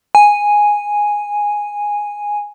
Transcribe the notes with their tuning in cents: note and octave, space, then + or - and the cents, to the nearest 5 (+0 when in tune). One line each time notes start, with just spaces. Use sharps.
G#5 -5